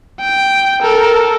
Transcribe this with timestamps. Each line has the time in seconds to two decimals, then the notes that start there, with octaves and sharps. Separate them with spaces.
0.20 G5
0.82 A4 A#4